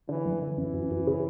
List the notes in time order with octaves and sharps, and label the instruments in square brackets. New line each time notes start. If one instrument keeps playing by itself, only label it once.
[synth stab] D3 [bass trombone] E3
[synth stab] F#2
[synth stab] D3 [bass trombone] E3
[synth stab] F#2
F#2
F#2
C#3